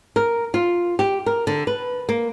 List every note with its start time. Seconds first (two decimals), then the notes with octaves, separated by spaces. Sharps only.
0.16 A#4
0.54 F4
0.99 G4
1.26 A#4
1.47 D3
1.67 B4
2.09 A#3